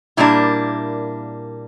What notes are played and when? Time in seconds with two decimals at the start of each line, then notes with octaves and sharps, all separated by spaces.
0.17 A#2 G3 A#3 D4 E4